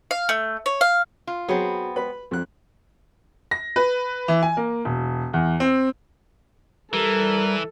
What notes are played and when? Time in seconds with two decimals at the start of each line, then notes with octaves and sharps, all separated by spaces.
0.11 F5
0.29 A3
0.66 C#5
0.81 F5
1.27 F4
1.48 F#3 B3 C4 G#4
1.96 B4 B5
2.31 F2 F#6
3.51 A#6
3.76 B4
4.28 E3
4.43 G#5
4.57 A#3
4.85 E1
5.33 E2
5.60 C4
6.93 E3 G3 A4 A#4